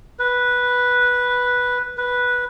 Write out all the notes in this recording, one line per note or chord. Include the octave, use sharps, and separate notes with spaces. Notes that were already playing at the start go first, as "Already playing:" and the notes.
B4
B4